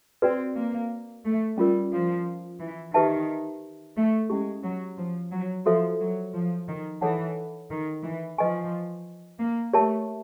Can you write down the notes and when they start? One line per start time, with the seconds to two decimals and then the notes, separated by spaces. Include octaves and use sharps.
0.22 C4 F#4 B4 D5 G5
0.56 A#3
1.25 A3
1.58 G3 C#4 F4 A#4
1.92 F3
2.60 E3
2.94 D#3 G4 B4 E5 A5
3.97 A3
4.30 G#3 C#4 E4 G4
4.64 F#3
4.98 F3
5.32 F#3
5.66 F3 F#4 A4 C5 E5
6.00 F#3
6.34 F3
6.68 D#3
7.01 E3 A4 C#5 F#5 A5
7.70 D#3
8.03 E3
8.38 F3 B4 D#5 G#5 C#6
9.39 A#3
9.73 A3 G4 A#4 C#5 E5 A5